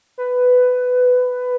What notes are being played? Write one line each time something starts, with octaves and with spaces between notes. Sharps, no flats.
B4